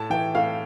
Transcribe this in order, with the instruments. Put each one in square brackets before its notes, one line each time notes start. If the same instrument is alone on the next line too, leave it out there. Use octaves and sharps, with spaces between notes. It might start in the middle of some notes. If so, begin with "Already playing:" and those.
Already playing: [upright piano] A2 A5
E3 G5
A2 F5